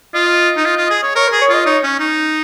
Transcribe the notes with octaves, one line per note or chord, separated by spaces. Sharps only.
F4 D#5
D#4
F4
F4
G#4
C#5
A#4 C#5
G#4 A#4
C#5
F4 D#5
D#4 C#5
C#4
D#4